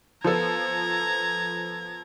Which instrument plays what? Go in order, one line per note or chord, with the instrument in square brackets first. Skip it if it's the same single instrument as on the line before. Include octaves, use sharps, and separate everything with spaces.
[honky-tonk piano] F3 B3 A4 [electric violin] A#5 G#6